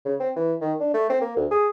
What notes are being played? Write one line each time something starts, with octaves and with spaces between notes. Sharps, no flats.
C#3
C4
E3
D#3
D4
A3
C4
A#3
D2
G#4